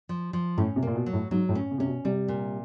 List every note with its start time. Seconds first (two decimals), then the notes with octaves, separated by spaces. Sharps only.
0.09 F3
0.33 F3
0.58 A2 C#4
0.76 C3
0.83 A#2 A#3
0.95 B2
1.06 F#3
1.13 A2
1.31 G#2 F#3
1.49 A2
1.55 C#4
1.71 C#3
1.78 C3 C#4
1.86 B2
2.05 C3 G3
2.28 A#2